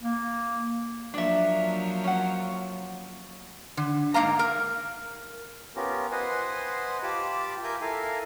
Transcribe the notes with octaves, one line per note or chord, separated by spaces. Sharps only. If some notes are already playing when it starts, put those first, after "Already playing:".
A#3
F3 F#3 A#3 D4 E5
C#4 F#5
D3
G#2 A#3 F5 A#5
A#4
B3 C#4 F4 G4 A#4
B4 C5 D#5 F#5 G#5 C6
F4 G4 A5 B5 D6
A#4 E5 G#5 D6 G6
E4 A4 A#4 F5 G#5